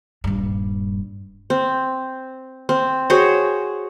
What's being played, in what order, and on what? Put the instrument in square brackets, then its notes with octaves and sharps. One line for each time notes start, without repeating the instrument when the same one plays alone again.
[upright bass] D#1 G2
[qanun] C4
C4
F#4 G#4 C5 C#5